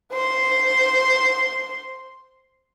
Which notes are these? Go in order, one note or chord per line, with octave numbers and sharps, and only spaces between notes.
C5 C6